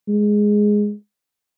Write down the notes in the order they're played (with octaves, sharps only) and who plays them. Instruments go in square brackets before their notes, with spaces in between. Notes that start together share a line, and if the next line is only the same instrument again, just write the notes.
[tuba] G#3